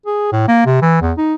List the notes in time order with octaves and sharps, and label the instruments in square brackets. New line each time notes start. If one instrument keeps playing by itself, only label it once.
[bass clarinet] G#4
A2
A#3
C3
E3
E2
D#4